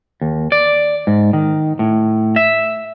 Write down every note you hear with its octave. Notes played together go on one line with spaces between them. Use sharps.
D#2
D5
G#2
D#3
A2
E5